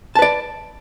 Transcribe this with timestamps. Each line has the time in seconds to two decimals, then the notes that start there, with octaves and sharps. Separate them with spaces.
0.15 A5
0.19 B4
0.22 D5